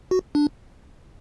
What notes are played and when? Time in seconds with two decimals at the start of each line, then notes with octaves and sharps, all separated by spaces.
0.11 F#4
0.35 D4